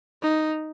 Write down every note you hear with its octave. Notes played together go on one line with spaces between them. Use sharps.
D#4